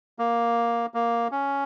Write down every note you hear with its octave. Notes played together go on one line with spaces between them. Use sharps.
A#3
A#3
C#4